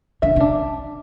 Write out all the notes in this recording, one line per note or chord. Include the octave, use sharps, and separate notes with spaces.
D3 E5
C#3
D4